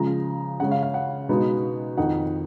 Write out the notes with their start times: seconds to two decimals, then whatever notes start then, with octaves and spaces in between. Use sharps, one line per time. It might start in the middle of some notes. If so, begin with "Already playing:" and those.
Already playing: C#3 F3 G#3 A#5
0.60 C#3 G#3 C#4 F#5
0.71 F5
0.83 F5
0.94 F#5
1.29 B2 G#3 B3 D#4
1.97 F2 D#3 A#3 D#4 F#5